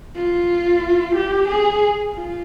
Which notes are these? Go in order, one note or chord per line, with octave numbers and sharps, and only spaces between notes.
F4
G4
G#4
F4